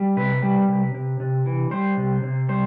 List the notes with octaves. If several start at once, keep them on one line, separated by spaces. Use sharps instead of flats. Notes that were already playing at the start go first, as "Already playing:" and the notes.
Already playing: G3
C3 B4
G3
C3
C3
C3
E3
G3 C5
C3
C3
G3 C5